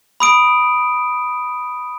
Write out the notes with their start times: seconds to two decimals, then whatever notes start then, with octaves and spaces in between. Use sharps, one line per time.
0.20 B5 D#6 D7